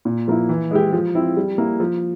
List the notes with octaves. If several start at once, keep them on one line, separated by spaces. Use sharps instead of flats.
A#2
F3 A#3 E4
E3
G#3 E4 G4
F3
C4 E4
G3
A#3 E4
F3